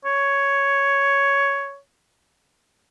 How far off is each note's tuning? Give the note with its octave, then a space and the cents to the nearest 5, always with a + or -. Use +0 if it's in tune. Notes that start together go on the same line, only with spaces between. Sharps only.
C#5 +5